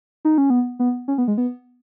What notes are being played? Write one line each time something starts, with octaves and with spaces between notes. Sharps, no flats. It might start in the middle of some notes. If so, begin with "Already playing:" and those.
D#4
C#4
B3
B3
C#4
B3
G#3
B3